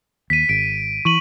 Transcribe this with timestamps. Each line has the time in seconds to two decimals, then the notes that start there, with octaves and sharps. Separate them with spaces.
0.30 D#2 B6 D#7
0.49 G#1 D7
1.05 E3 C#6 D#7 F#7